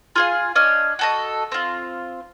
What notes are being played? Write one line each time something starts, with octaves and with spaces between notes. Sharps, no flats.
F4 G#4 F5
D4 C#5 D#5 F6
F#4 A4 D#5
C4 F4